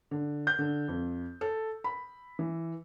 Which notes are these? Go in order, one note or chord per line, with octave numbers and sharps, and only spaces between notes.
D3
G6
D3
F2
A4
B5
E3